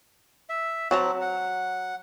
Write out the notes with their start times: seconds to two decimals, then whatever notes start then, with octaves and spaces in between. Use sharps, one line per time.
0.49 E5
0.91 F#3 C4 A5 A#5
1.21 F#5